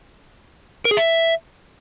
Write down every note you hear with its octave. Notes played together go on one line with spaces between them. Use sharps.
A#4
G#4
E5